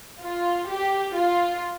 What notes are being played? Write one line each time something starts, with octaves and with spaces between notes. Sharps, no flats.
F4
G4
F4